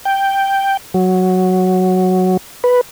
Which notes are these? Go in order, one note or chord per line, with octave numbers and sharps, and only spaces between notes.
G5
F#3
B4